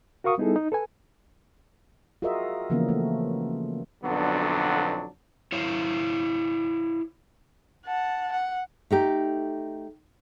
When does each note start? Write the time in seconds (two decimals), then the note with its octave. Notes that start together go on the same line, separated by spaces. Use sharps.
0.24 F#4 A#4 F5 C#6 D#6
0.38 G3 B3 D#4 E4 G#4 A4
0.56 D#4
0.72 A4 B4 G#5
2.22 F4 F#4 G#4 A#4 D#5 E5
2.70 C#3 E3 F3 A#3 B3 C#4
2.89 A3
4.04 B1 F2 D3 F#3 B3 D4
5.52 E4 C5 C#5 F5
7.87 F#5 A5
8.32 F#5
8.91 A3 D#4 G4